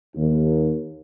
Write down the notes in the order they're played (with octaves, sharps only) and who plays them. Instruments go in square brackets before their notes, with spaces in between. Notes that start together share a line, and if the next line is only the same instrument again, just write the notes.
[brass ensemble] D#2